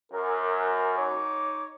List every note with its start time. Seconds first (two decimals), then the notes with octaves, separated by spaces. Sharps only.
0.12 F#2 A#4
0.98 D#4 C#5 D6